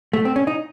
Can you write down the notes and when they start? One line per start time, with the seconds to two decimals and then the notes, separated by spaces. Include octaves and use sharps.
0.13 A3
0.25 C4
0.36 C#4
0.47 D#4